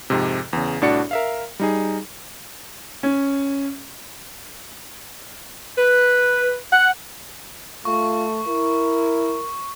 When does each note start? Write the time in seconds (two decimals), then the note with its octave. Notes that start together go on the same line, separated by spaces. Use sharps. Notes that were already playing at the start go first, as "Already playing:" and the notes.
0.10 F2 G#2 C3
0.53 E2 C#3
0.81 C2 A2 D4 F#4 D5 C#7
1.11 A#4 E5 F5
1.60 G3 D#4 G#4
3.03 C#4
5.78 B4
6.72 F#5
7.85 A3 F4 C#6
8.47 E4 A#4